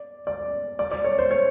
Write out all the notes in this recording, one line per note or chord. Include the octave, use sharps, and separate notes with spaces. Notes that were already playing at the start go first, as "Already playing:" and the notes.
Already playing: D5
D5
D5
D5
C#5
C5
C#5